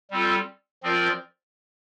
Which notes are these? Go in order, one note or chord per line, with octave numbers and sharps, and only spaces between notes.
G3 C4 F4 A4
F3 C4 F4 A#4 D5